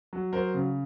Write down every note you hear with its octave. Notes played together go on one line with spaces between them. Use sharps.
F#3
F#3 A#4 C5
C#3